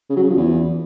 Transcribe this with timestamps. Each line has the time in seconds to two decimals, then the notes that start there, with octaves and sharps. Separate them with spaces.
0.10 C#3
0.16 F#3
0.23 C#3
0.30 F3
0.37 E2